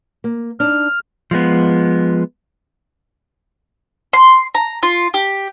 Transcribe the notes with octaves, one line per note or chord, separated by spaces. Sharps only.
A#3
D4 D#4 F6
F3 G#3 B3
C6
A#5
F4
G4